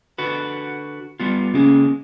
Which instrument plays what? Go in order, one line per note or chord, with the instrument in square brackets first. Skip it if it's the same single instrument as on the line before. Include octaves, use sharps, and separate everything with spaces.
[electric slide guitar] D3 F#4 B4
G3 B3 F4
[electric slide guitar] C#3 G#3 A#3 [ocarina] C#4